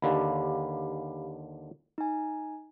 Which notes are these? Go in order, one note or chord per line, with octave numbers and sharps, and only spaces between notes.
D#2 D3 G4 F5 B5
D#4 G#5